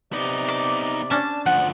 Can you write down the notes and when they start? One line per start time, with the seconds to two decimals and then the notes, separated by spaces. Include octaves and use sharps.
0.13 C3 B3 D#4 D5
0.48 D6
1.11 C#4 D4 A5
1.46 D2 F3 F#5